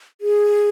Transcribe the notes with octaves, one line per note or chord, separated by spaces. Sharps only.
G#4